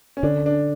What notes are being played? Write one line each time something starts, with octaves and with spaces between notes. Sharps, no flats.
C#4
D3 D4
D4